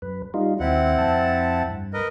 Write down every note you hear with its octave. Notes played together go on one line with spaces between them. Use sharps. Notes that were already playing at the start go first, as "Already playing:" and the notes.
F#2 B4
G3 D#4 F4
D#2 C4 E4 F#5
F2 A5
G2
A#4 B4 D#5